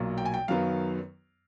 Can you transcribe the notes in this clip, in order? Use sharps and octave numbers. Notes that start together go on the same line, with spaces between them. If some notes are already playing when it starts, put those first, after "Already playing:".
Already playing: B1 A#2 F#3 A#3
G5
G#5
G5
F#2 D#3 F#3 B3 F5